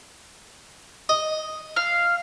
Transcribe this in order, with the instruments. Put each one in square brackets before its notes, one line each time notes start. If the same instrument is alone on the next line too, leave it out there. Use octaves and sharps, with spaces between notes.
[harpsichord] D#5
[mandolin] F5